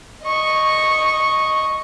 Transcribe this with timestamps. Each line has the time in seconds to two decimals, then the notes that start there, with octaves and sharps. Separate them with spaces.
0.23 D#5 C#6